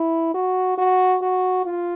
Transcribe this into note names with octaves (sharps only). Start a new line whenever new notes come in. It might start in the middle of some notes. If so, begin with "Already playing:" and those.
Already playing: E4
F#4
F#4
F#4
F4